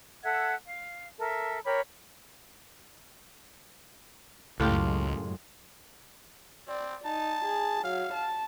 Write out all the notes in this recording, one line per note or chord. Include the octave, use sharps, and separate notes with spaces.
A4 E5 F#5 G#6
F5
A4 A#4 E5
G4 A#4 C#5 B5
C#2 F#2 A2 G#3 F4 G4
C4 D5
D#4 A5
G#4
F#3 F5
A5